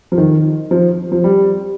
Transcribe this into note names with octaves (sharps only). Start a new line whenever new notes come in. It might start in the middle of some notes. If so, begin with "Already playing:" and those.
F3
D#3
F3
F3
G3